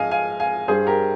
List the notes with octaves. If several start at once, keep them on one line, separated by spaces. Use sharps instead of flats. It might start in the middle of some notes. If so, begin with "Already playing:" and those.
Already playing: G#2 F3 G#3 D#5 F5 G#5
F5 G#5
F5 G#5
G2 G3 G#4 C5
G4 A#4